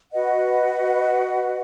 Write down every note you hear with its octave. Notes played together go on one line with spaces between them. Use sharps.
F#4 B4 D#5 F#5